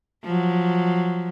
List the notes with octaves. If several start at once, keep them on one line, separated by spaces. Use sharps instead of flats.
F3 F#3